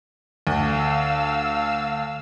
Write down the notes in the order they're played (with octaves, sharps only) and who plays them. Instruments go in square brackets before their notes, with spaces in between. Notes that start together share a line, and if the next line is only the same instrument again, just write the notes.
[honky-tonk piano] D2 [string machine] F5 E6